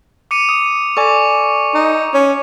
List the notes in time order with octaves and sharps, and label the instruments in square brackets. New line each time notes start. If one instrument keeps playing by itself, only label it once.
[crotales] D6 C#7 D#7
[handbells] D#6
[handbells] A4 D5 G#5 [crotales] C#6 D6
[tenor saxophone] D#4
C#4